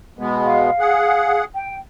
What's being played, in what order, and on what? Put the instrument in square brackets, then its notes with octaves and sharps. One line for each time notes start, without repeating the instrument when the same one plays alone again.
[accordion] B2 G#3 B3
[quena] F5
[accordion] G#4 F#5
[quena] G5